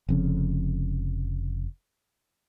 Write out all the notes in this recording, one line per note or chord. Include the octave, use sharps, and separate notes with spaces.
F1 F2 C#3